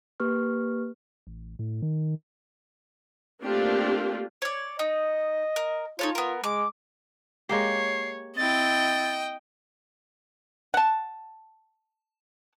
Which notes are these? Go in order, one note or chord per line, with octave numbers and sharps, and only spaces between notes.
A#3 G4 B4 C#6 F6
A1
A2
D#3
A3 A#3 C4 D4 F4 G4
C#5 D5
D#4 D#5
A#4
D#4 F4 A4 C#5
B3 A#4
G#3 D6
G#3 A#3 G4 C#5 C7
C4 E4 D#5 G5 A6
F#5 A5